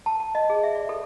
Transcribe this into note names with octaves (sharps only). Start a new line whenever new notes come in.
A5
A5
D#5
G#4
E5
D5
A4